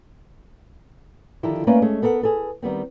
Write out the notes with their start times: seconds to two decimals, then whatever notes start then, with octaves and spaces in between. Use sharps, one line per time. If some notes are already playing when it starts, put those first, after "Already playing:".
1.43 D3 D#3 F3 D4 E4 G4
1.67 A3 A#3 C#4 B4 D5 F5
1.82 G#3 A3 C#4 G#4
2.02 B3 A4 A#4 D5 F#5
2.21 G#4 A4 B4
2.62 D#3 G3 B3 C4